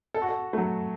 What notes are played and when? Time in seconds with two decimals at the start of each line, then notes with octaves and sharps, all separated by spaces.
0.14 A4
0.22 F#4
0.29 A4
0.53 A3
0.58 F#3